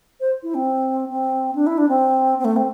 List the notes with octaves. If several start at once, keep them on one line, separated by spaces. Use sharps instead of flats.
C5
E4
C4
C4
D4
E4
D4
C4
C4
A3
C4